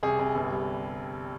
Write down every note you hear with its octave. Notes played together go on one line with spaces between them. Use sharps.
C2 G#4
C2
G1
G3